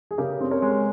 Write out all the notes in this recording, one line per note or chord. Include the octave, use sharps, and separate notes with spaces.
G#4
C#3 G4 A#4
C4
A#4 C#5
G#3